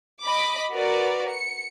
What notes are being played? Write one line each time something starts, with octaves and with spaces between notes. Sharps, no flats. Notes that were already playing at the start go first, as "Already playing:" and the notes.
D#5 B5 D6
F#4 A#4 B4 D5
C#7